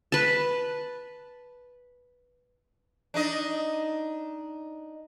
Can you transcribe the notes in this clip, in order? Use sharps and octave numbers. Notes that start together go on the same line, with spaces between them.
B4 A5
D4 D#4 D#5